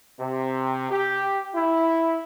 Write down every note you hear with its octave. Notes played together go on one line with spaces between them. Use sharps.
C3
G4
E4